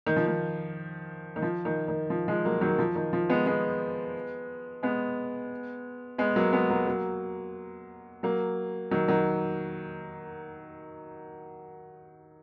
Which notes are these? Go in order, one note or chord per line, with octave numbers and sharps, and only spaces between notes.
D#3
F3
D#3
D#3
F3
D#3
D#3
F3
F3 G#3
F#3 A#3
D#3 F#3
F3
D#3
F3
G#3 B3
G#3 B3
G#3 B3
G#3 B3
F#3 A#3
G#3 B3
F#3 A#3
F#3 A#3
F#3 A#3
D#3 F#3
D#3 F#3